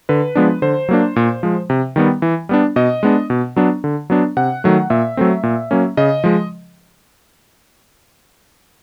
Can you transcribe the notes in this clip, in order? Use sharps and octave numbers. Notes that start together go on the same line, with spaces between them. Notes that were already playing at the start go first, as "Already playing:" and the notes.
D3 B4
F3 G#3 B3 D4
D3 C5
F#3 A#3 D4
A#2
F3 G#3
C3
D#3 G3 B3
E3
G3 B3 D4
B2 D#5
G#3 B3 D4
B2
F#3 B3 D4
D3
F#3 B3 D4
C3 F#5
D#3 F#3 A3
A#2 E5
F#3 A3 C4
A#2
F#3 A#3 C#4
C#3 D#5
F3 G#3